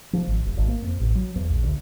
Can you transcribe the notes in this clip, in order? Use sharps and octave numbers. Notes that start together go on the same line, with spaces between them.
F3
G#1
E1
G#1
A#3
F2
A1
F#3
E2
A#1
D2